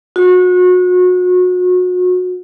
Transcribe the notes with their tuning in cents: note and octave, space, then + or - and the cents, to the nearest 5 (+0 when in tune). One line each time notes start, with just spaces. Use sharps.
F#4 -30